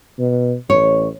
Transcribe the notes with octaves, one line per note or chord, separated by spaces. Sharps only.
B2
A1 C#5